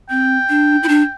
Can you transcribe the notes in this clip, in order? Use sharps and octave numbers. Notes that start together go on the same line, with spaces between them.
C4 G5
D4
E4
D4